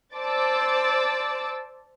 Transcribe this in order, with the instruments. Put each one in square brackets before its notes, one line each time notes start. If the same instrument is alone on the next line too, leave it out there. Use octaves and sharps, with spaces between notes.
[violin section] C5 D5 A5 D6 E6 A6